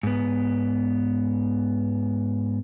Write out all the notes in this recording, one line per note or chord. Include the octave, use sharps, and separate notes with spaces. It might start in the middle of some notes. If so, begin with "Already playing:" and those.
G#2 B3